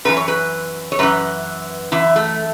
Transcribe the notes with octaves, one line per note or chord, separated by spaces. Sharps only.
F#2 E3 B4
C#5
B4
C#5
F#2 E3 B4
F#2 E3 E4
A3